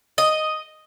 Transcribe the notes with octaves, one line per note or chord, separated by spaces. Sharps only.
D#5